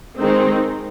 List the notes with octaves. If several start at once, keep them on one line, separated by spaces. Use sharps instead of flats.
D#3 G#3 C4 D#4